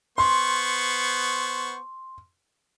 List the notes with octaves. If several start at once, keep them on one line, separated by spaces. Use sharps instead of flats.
B3 C5 C6 C#6